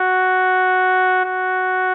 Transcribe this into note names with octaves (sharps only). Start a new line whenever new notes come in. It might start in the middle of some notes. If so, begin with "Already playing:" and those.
Already playing: F#4
F#4